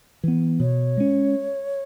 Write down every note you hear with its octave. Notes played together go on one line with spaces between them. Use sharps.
E3 B3
B2 C#5
G#3 C#4